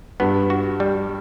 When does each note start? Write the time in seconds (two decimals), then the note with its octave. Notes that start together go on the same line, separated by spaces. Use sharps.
0.20 G2 B3
0.50 F#4
0.80 G3